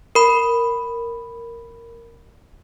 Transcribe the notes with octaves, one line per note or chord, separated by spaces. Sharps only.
A#4 B5